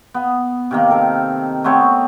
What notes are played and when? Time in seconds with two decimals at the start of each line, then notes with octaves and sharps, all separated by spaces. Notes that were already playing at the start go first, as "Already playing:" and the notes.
0.14 B3
0.71 C3 D#3 A#3
0.90 A4 A#4 F5
1.64 A3 B3 C4 C#5